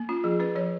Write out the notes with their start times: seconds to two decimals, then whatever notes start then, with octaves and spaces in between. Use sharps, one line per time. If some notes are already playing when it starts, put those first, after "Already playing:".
Already playing: A#3
0.09 C#4 F4
0.24 F3 G#4
0.40 C#4 B4
0.55 F3 C#5